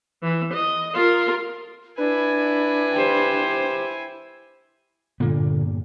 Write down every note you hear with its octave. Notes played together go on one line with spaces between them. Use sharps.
E3
D#5
F4 A#4
D4 E4 B4 G#5
G4 C5
G2 A#2 D3 A#3 B3